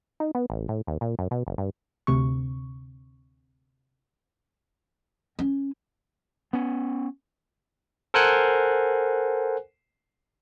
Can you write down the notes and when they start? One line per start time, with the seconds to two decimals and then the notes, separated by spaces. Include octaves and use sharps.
0.20 D#4
0.35 B3
0.50 A1
0.69 A2
0.87 D#2
1.01 A#2
1.19 F#2
1.31 B2
1.47 F#1
1.58 G2
2.07 D2 C3 C#6
5.39 C#4
6.53 B3 C#4
8.14 A4 A#4 C5 F#5 G#5 F#6